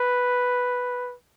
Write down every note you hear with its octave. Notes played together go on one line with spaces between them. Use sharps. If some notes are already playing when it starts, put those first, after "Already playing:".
Already playing: B4